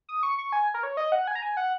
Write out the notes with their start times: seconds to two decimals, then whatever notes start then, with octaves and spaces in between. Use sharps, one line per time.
0.09 D#6
0.23 C#6
0.38 C#6
0.53 G#5
0.74 A#4
0.83 C#5
0.97 D#5
1.12 F#5
1.27 G#5
1.35 A#5
1.42 G#5
1.57 F#5